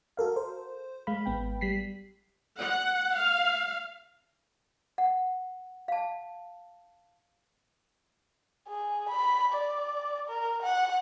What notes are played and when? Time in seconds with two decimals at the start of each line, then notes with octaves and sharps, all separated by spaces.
0.17 F#4 A4 A#4 F5
0.36 C5
1.07 G#3 F5 B5
1.26 G#1 B3 G5
1.61 G3 B6 C7
2.59 F#5
3.16 F5
4.98 F#5
5.88 F5 A5
8.68 G#4
9.09 B5
9.53 D5
10.29 A#4
10.62 F#5